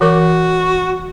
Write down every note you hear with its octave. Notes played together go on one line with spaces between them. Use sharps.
E3 F#4 A#4 D6